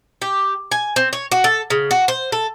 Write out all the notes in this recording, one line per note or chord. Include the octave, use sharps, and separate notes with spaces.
G4
G#5
C4
C#5
F#4
A4
C#3
F#4
C5
A4